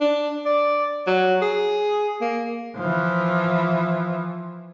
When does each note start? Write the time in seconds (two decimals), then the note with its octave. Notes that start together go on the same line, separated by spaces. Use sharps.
0.01 D4
0.46 D5
1.07 F#3
1.42 G#4
2.21 A#3
2.76 E3 F3